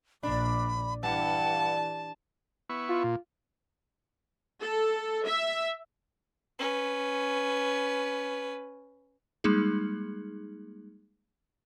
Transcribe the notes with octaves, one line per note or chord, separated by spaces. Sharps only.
A#1 D4 B5
G2 E3 F#5 A5
B3 E4 C#6
F4
A#2
A4
E5
C#4 B4
G3 G#3 A#3 D#4 G#4